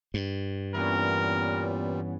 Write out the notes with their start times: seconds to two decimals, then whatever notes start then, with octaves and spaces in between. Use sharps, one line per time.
0.14 G2
0.74 A#2 E3 G3 B3 C#4 A#4